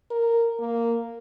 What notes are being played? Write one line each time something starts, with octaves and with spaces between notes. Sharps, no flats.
A#4
A#3